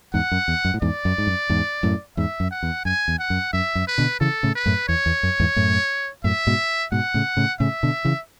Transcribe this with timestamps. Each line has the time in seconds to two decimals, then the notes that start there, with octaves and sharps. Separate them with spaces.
0.14 E2 G#2 F#5
0.32 F#2
0.48 E2
0.65 F#2
0.74 A2
0.82 E2 G#2 D5
1.05 F#2
1.18 G#2
1.27 F#2
1.50 E2 G#2
1.83 F#2 A2
2.17 E2 G#2 E5
2.40 F#2
2.51 F#5
2.63 E2
2.85 F#2 G#5
3.08 E2
3.19 F#5
3.30 F#2
3.53 F#2 E5
3.75 F#2
3.88 B4
3.98 B2 D3
4.20 C#3 E3 A4
4.43 A2 C#3
4.55 B4
4.66 F#2 A2
4.88 E2 C#5
5.06 E2
5.23 F#2
5.40 E2 G#2
5.56 F#2 A2
6.24 F#2 A2 E5
6.47 G#2 B2
6.92 G#2 B2 F#5
7.14 A2 C#3
7.37 A2 C#3
7.60 A2 C#3 E5
7.83 B2 D3
8.05 C#3 E3